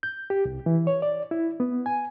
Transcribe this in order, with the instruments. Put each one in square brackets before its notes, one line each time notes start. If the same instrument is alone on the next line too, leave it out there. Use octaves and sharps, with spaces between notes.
[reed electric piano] G6
G4
C2
E3
C#5
D5
E4
B3
G#5